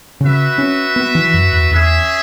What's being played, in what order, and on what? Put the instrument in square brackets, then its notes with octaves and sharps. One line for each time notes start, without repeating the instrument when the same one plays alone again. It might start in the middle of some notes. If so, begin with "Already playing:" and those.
[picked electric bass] C#3 [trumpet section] F#4 B4 E5
[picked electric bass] C#4
B3
E3
F#2
E2
[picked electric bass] E2 [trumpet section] C#4 G#4 E5